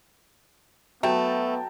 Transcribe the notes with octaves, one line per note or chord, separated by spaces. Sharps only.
F#3 A3 B3 G5 A5